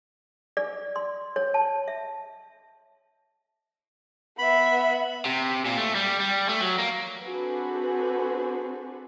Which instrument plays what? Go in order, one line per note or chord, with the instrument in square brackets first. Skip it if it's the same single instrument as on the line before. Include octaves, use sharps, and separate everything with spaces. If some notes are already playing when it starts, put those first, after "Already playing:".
[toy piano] D5
C6
C#5
A5
E5
[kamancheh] B3 E5 [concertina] B5
[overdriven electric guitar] C3
A#2
A3
G3
G3
A3
F#3
A#3
[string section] C4 D4 F#4 G#4 A4 B4